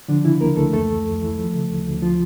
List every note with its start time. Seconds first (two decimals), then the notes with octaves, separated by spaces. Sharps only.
0.08 D3 F3 D4
0.24 C#3 E3 E4
0.41 C#2 A#3 A#4
0.57 C#2 A3 A4
0.73 F2 A3 A4
0.89 E3
1.06 F2
1.22 E3
1.38 F3
1.54 C#3
1.71 D2
1.86 D2
2.02 F3 F4